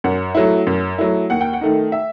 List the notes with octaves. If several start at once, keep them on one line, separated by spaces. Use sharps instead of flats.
F#2 F#5
F#3 A3 E4
F#2
F#3 A3 E4
D#2 F#5
G5
F#5
D#3 A3 D#4
E5